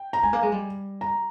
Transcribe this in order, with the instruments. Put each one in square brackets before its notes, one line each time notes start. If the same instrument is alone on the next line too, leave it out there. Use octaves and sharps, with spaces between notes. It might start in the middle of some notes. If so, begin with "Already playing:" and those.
Already playing: [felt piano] G5
A#5
[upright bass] G#3 [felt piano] G#5
[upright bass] A#3
G#3
G3
[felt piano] A#5